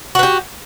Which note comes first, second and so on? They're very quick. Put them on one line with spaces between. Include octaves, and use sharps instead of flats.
F#4 B4 G4